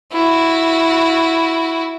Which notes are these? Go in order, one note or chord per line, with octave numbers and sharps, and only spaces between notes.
E4 F#4